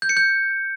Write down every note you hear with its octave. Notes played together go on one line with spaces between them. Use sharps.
G6
C#7
G6